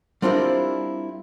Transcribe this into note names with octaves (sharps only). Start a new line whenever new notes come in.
G3 C4 D4 E4 F4 A#4